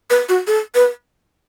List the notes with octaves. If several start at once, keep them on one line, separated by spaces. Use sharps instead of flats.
B4
F#4
A4
B4